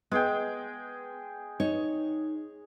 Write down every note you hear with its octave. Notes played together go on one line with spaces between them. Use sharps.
G#3 B3 G#4 G5
D#4 C#5